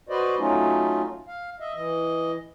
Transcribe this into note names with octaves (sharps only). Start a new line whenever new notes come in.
F#4 B4 C5 D5 D#5
F#3 A3 C#4 D#4 F4
F5
D#5 E5
E3 D#5